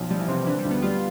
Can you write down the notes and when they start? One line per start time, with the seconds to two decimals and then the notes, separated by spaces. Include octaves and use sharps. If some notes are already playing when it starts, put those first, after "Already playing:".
Already playing: B1 F3
0.10 F3 G3
0.20 E3
0.28 C3 C4
0.46 D3 E3
0.59 G3
0.65 D2
0.71 B3
0.82 G3 F4